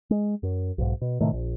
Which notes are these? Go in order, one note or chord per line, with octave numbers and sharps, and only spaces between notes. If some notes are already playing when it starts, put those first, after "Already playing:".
G#3
F#2
B1 G#2
B2
A2 C3 D#3 A3
A#1